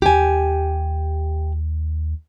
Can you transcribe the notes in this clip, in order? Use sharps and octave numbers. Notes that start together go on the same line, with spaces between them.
D#2 G4 G#5